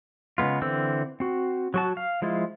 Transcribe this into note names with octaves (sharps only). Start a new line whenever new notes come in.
C#3 G#3 B3 F4
D3 E3 C4 E6
C4 F#4
F#3 F#4 A5
F5
F3 G#3 E4 F4